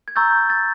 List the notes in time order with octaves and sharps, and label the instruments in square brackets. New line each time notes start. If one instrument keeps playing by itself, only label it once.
[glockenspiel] G#6
A#5 C#6 E6 G6 A6
A6